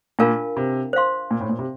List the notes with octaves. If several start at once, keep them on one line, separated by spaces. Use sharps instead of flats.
A#2 D4 F4 A#4 F5 A5
C3
C5 F5 C6
A#2
A2
A#2
C3